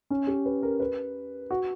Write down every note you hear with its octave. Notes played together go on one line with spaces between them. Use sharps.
C#4
G4
B4
A#4
B4
F#4